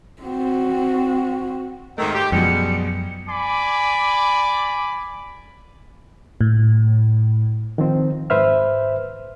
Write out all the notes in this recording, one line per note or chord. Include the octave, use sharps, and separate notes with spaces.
C4 F#4
G#2 D#3 A3 E6
G4 G6
F#2 B2 F3 G3 G#3 B3 C#7
D5 G#5 B5 D6
A2
D#3 F3 C4
G#2 B4 C5 E5 F6